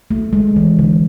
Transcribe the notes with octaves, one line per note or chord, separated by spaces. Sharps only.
A3
G#3
E3
D3